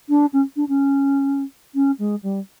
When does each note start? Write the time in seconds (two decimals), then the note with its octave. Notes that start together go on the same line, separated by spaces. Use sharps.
0.09 D4
0.33 C#4
0.56 D4
0.68 C#4
1.75 C#4
1.99 G#3
2.23 G3